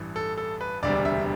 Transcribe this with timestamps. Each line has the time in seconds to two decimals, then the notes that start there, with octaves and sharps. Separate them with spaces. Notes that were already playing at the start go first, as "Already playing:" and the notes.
Already playing: A1 G2 E3 G3
0.16 A4
0.38 A4
0.61 B4
0.83 E1 D2 C3 G3 D5
1.05 E5